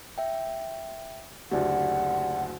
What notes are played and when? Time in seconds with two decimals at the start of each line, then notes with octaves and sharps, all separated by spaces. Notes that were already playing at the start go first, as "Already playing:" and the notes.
0.18 E5 G5
1.51 F#1 D2 G4 D5 F#5